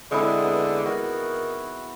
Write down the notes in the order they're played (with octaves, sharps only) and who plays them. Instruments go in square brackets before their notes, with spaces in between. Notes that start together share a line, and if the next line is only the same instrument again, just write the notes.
[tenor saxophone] D3 [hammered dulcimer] G#3 C4 E4
[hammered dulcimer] B3
[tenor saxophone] D#3 [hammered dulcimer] F#4